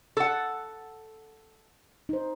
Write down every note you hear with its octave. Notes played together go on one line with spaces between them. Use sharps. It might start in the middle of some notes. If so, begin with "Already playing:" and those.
A4 F#5
D#4 C5